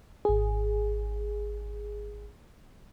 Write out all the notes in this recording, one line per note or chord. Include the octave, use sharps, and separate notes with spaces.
G#1 G#4